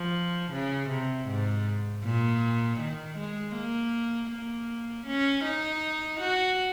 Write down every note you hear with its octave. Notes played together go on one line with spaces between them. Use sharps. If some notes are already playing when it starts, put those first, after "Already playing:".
Already playing: F3
C#3
C3
G#2
A#2
D#3
G#3
A#3
A#3
C#4
D#4
F#4